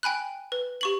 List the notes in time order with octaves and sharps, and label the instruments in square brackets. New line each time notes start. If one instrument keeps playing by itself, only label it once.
[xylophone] G5 G#5 B5 F#6
B4
G4 C#6 F#7